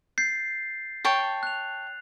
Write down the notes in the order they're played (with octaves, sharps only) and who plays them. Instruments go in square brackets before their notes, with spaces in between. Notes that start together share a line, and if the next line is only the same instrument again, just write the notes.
[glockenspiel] G6 A6 C7
[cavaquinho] C#5 G5 A5
[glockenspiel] F#6 F7